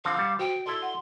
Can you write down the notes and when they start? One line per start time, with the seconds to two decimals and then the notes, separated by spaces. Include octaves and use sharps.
0.05 D3 F3 C4 F5
0.18 G3 F#5 A5
0.39 F#4 C5 G5
0.66 E4 A4 D5 C6
0.82 F#5